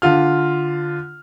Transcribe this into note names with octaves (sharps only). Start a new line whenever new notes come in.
D3 F4 F6